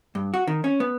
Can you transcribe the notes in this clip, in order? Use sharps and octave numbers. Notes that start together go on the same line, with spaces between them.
G2
F#4
D#3
C#4
B3